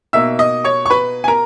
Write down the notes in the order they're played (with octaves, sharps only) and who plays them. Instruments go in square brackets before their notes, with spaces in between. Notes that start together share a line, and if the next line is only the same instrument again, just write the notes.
[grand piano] B2 A#3 D#4 E5 E6
D#5 D#6
C#5 C#6
C#6
B4 B5
G#5
A#4 A#5